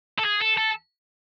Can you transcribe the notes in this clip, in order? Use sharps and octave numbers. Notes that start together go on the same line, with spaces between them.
A4
G#4
A4
A4